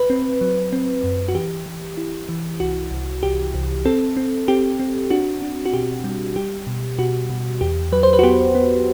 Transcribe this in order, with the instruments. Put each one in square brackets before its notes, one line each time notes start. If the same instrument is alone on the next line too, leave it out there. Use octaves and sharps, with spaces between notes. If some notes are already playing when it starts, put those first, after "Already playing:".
Already playing: [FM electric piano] B4
C4
F#3
C4
F#2
F#4
E3 G4
E3
E4
E3
C2 F#4
C2
C2 G4
C2
C4 A4
C4
C4 G4
C4
D4 F#4
D4
F#4
B2 G4
G3
G3 G4
B2
B2 F#4
B2
E2 G4
F#3 B4
C5
B4
F#4
B3 G4
B3